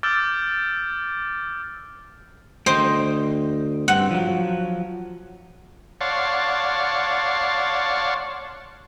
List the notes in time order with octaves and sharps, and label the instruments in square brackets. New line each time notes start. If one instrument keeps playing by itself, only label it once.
[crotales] D6 E6 F6 G6 A6 D7
[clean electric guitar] D2 D#5 G5 [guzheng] C5
[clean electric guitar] G2 C4 [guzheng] F#5
[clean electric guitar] F3 F#3
[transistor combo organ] C#5 D5 F5 F#5 A5 C6